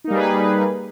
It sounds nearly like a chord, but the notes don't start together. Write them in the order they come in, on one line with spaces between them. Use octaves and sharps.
D#4 A#3 G3 G#4 B4